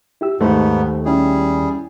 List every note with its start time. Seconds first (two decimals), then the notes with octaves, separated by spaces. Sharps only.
0.21 E4 G4 E6
0.40 D#2 G#2 A3 B3 A4 C5
1.05 G3 C#4 E4 G#4